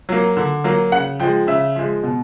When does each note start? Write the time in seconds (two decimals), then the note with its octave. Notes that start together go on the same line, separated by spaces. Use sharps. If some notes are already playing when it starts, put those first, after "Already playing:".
0.09 F#3 A#3
0.37 D3
0.64 F#3 A#3
0.92 C#3 F#5
1.20 F3 G#3 G5
1.47 C#3 E5
1.76 F3 G#3
2.03 B2